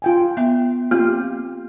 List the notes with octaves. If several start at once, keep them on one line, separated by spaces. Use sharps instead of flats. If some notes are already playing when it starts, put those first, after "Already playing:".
F4 G5 G#5
B3 E5
A#3 C4 F4 G4 F5